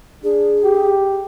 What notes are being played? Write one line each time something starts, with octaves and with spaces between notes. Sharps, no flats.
D4 G#4
G4